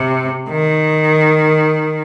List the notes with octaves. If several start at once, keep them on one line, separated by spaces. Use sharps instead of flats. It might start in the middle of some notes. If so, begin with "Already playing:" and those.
Already playing: C3
D#3